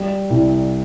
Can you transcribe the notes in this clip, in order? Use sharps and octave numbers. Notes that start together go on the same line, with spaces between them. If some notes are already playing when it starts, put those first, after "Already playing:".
Already playing: G3
C2